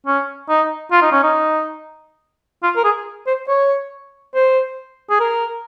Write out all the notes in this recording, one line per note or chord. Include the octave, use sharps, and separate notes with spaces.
C#4
D#4
F4
D#4
C#4
D#4
F4
A#4
G#4
C5
C#5
C5
G#4
A#4